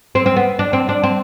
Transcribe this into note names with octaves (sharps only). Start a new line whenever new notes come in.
C4
C4
B3
D4
C4
D4
C4